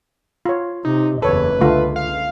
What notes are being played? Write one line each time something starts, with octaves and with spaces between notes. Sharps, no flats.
F4 C#5
C3 D#4
F#1 E2 A4 B4 C#5
C#2 D3 A3 F4
F5